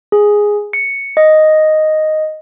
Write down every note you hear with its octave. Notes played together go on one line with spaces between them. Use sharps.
G#4
C#7
D#5